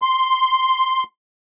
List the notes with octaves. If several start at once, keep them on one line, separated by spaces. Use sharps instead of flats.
C6